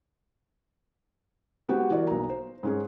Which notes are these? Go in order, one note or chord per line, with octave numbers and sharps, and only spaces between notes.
G#3 B3 F#4 G4 C5 F#5
E3 F#4 A#4 D5
B1 A#5
C5
G#2 C#4 G#4